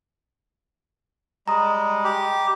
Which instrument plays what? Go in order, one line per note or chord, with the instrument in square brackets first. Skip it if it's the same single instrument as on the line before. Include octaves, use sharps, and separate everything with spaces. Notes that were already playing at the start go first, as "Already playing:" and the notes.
[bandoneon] G3 G#3 [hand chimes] A#5 D#6
[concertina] G4